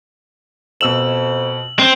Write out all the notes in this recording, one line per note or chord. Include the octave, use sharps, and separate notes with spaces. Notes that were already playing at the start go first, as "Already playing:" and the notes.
F2 B2 E6 E7 F#7
C4